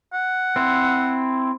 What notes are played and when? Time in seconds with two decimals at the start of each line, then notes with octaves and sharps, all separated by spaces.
0.13 F#5
0.56 C4 E4